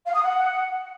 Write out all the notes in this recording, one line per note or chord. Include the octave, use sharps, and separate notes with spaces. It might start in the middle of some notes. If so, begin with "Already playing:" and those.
F5
D#6
F#5